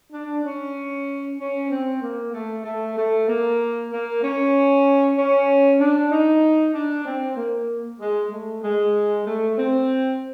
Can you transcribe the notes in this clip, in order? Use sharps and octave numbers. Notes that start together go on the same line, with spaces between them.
D4
C#4
C#4
C4
A#3
A3
A3
A3
A#3
A#3
C#4
C#4
D4
D#4
D4
C4
A#3
G#3
A3
G#3
A3
C4